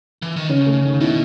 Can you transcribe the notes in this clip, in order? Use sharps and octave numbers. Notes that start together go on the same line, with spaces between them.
E3
D#3
C#3 C#4
A3
D#3
B2 E4